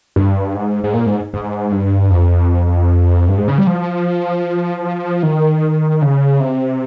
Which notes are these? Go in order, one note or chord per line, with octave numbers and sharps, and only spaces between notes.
G2
G#2
G#2
A#2
G#2
G#2
G2
F2
G2
G#2
C#3
G3
F3
D#3
C#3
C3